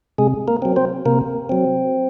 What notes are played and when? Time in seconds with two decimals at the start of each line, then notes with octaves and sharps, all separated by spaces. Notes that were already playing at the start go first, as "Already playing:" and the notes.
0.18 C3 G#3 G#4
0.48 A#3 A#4
0.62 F#3 C4
0.76 C4 C5
1.06 C3 A#3 A#4
1.49 F#3 C4